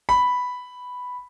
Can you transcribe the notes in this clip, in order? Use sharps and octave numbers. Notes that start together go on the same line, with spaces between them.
B5